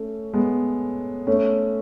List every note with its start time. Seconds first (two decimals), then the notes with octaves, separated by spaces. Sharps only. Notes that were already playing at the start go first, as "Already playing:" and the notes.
Already playing: A3 C#4
0.34 G#3 B3
1.27 A3 C#4